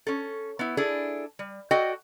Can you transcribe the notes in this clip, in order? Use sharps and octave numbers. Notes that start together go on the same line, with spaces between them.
C#4 A4
B3 E4
D4 E4 G#4 A4
G3
F#4 A4 D5 D#5 G5